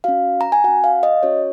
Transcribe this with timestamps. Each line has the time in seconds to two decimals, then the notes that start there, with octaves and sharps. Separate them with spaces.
0.04 C#4 F#4 F5
0.41 A#5
0.52 G#5
0.64 F#4 F#5
0.68 C#4
0.84 F5
1.03 D#5
1.23 C#4 F#4 C#5